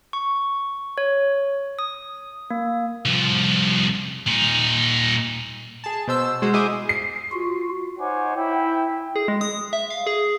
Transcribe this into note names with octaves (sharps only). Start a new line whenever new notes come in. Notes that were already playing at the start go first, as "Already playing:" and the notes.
C#6
C#5
D#6
A#3
C2 F3
A#2 D#4
G#4 A5
B2 C5 E6
G#3 F#4 C5
E4 G#4 C5 D#5 G#5 D6
C7
F4 F#4
D#4 C5 C#5 F#5 G#5 D6
E4 G5
G#4
G#3
D#6
E5
F5
G#4